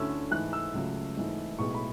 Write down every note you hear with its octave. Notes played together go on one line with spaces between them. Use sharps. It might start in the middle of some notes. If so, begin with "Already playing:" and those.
Already playing: D2 D3 A3 C#4 E4 E6
G#2 E3 A3 E4 F#6
E6
C#2 C#3 F#3 A3
G#1 G#2 E3 A3
B1 A2 G#3 B3 C#6
B5